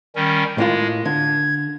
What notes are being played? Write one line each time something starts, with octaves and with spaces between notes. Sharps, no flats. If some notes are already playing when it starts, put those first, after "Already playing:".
D#3 G3 C#4
A2 G#3 A#3 F4
D3 G#6